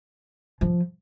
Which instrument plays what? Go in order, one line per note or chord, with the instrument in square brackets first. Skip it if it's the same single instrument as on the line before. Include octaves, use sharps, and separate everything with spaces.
[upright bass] F3